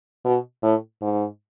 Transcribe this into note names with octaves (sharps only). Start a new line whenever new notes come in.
B2
A2
G#2